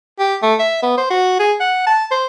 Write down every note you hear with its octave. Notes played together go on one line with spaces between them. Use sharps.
G4
A3
E5
B3
C5
F#4
G#4
F#5
A5
C5